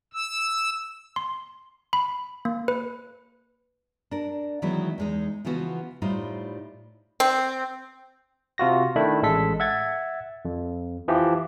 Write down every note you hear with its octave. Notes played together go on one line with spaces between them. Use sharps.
E6
C6
B5
A#3
B4
D4 A#4
D#3 E3 F#3 G#3 B3 E4
E2 G#3 D#4
C#3 E3 F3 B3 F#4
A2 G3 D#4 F4 C5
C4
C3 F4 F#4 A#6
D#3 A3 D4 E4 B5
A1 G#3 A4 B6
E5 F#5 G#6 A6
F2
E3 F3 G4